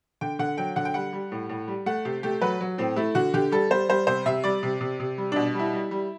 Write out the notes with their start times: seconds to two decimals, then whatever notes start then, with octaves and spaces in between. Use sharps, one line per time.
0.21 D3 G5
0.39 D3 F#5
0.58 F#3 G5
0.76 D3 F#5
0.85 G5
0.94 G3 F#5
1.13 G3
1.32 A2
1.49 A2
1.68 G3
1.86 A3 F#5
2.05 C3 G4
2.23 A3 G4
2.41 F#3 B4
2.61 F#3
2.78 A2 C4
2.96 A3 E4
3.15 D3 F#4
3.34 D3 G4
3.52 G3 A4
3.70 G3 C5
3.89 G3 C5
4.07 C3 C5
4.26 C3 E5
4.44 G3 D5
4.63 C3
4.81 C3
5.00 C3
5.18 G3
5.32 B2 D4
5.55 G3 E4
5.73 G3
5.91 G3